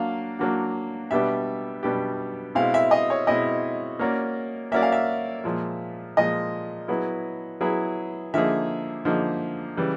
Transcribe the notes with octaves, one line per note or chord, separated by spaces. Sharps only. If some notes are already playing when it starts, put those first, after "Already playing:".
Already playing: F#3 A#3 D4 F#4 F5
F#3 A#3 D4 F#4
B2 G3 B3 D4 G4 E5
B2 G3 B3 D4 G4
B2 G#3 C4 E4 F5
E5
D#5
C#5
B2 G#3 C4 E4 D#5
A#3 C#4 F#4 A#4 D5
A#3 C#4 F#4 A#4 D5 E5
F5
E5
A#2 F3 G#3
A#2 F3 G#3 D#5
F#3 B3 E4 G#4
F#3 B3 E4 G#4
D3 F3 A#3 D#4 G#4 E5
D3 F3 A#3 D#4 G#4
C#3 E3 G3